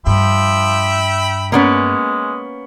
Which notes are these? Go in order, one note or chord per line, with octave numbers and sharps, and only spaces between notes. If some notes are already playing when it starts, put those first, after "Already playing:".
G2 F3 E5 G5 B5
G#3 A#3 B3 C#4